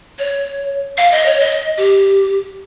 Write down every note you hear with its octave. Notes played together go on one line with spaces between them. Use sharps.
C#5
F5
D#5
C#5
D#5
G4